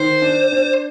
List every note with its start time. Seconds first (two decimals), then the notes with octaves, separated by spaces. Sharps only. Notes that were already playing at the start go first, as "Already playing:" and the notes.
Already playing: D#3 C5
0.22 D4
0.52 D4